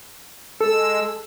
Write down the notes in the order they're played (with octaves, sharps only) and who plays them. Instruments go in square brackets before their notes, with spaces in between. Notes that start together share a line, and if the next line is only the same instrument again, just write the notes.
[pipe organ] G#3 E6 [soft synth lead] A4